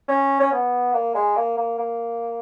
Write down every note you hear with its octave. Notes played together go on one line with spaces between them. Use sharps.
C#4
C#4
B3
A#3
G#3
A#3
A#3
A#3